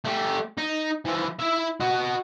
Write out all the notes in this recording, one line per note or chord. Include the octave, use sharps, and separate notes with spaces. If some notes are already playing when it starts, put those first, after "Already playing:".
A3 G4
D#4
E3 F3
E4 E5
F#4 D#5